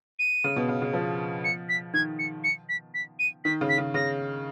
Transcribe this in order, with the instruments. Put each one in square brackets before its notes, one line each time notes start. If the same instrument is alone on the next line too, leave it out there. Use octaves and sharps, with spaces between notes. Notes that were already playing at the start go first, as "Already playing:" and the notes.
[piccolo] D#7
[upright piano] C#3
B2
C#3
C#3
F3
[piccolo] C#7
B6
[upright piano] D#3 [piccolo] G#6
[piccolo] C#7
C#7
B6
B6
D#7
[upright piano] D#3 [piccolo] B6
[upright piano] C#3
[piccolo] B6
[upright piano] C#3
[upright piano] C#3 [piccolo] A#6